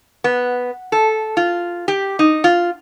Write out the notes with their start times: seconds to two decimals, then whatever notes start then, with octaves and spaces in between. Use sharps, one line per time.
0.24 B3
0.92 A4
1.37 F4
1.88 G4
2.19 D#4
2.44 F4